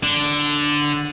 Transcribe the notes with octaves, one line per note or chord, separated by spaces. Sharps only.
D3